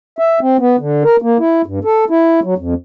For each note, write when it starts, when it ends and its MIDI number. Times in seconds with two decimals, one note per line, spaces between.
0.19 0.39 76
0.41 0.57 60
0.59 0.76 59
0.79 1.03 50
1.04 1.16 70
1.22 1.38 58
1.39 1.62 64
1.66 1.79 43
1.84 2.05 69
2.10 2.40 64
2.43 2.54 54
2.58 2.74 41